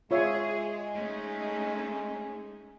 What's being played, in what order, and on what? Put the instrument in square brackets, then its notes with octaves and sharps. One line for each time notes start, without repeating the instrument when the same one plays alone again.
[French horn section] G#3 [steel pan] F4 C#5 E5 [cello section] G#4
[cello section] A3 C#4 D#4